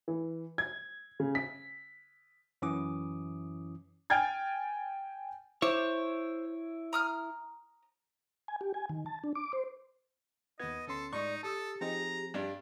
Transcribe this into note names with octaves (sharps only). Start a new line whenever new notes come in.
E3
G#6
C#3
B6
F#2 E3 C#4 E4 D6 D#6
G5 G#5 F6 G#6 A6
E4 C5 C#5 D6
A#5 D#6 F6
G#5
G4
G#5
D#3
A5
D4
D6
C5
D#2 B3 D#5 G#6
D2 C#4 A4 C6
A2 G#3 D#4 D5 C#6
G4 A4 A5 D#6 E6
F3 C4 D#4 G#4 A#5
G2 D4 G4